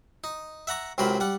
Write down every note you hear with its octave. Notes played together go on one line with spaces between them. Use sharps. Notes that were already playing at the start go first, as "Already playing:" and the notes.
D#4
E5 F#5 A#5 C#6
C#2 C3 F#3 A#4 C5 B5
G3 F#5